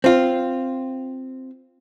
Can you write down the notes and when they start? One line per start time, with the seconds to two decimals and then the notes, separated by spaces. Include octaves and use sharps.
0.04 C4 F4